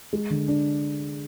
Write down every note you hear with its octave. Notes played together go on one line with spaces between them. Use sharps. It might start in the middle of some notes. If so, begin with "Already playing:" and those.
G#3
D3
D4